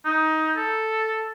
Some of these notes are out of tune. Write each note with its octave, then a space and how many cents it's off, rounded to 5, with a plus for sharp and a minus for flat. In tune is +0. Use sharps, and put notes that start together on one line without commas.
D#4 +15
A4 +0